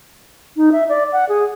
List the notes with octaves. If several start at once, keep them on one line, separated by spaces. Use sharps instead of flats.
D#4
E5
D5
F#5
G#4